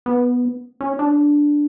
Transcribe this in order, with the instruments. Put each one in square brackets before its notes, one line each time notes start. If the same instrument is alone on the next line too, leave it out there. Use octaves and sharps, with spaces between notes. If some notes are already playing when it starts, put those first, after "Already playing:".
[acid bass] B3
C#4
D4